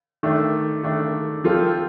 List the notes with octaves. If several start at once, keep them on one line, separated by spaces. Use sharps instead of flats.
D#3 A3 D4
D#3 A3 D4
F3 C4 F4 A4